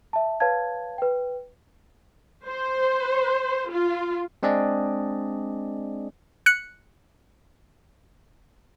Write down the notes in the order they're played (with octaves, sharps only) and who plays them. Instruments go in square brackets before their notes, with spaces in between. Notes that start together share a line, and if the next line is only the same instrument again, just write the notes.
[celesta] E5 A5
B4 C#5 F5 A5 G#6
B4 G5
[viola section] C5
F4
[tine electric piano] G#3 C4 D4 G#4 D5 D#5
[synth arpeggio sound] F#6 C#7